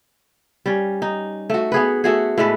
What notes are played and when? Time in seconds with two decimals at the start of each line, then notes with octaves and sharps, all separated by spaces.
0.66 G3 C#4
1.02 D#4
1.50 A3 F#4
1.72 B3 G#4 B4
2.04 A3 F#4 G#4
2.38 A2 G#3 A3 B4